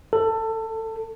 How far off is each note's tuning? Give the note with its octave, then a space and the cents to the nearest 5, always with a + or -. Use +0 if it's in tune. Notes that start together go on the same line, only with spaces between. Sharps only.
A4 +20